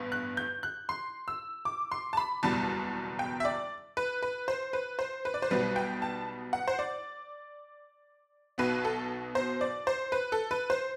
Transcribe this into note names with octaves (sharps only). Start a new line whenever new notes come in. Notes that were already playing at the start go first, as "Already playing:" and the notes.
Already playing: A1 G2 B3
F#6
G6
F#6
C6
E6
D6
C6
A5
B5
F#1 E2 B2 G3 A5
G5
E5
D5
B4
B4
C5
B4
C5
B4
D5
C5
B1 B2 G3 B3 B4
G5
A5
F#5
C5
D5
B1 B2 F#3 B3 B4
A4
C5
D5
C5
B4
A4
B4
C5